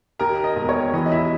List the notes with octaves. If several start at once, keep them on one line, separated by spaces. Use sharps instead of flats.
D#2 A#4 A#5
D#5
E1
C#5
E3 D#5
D#5
E4 E5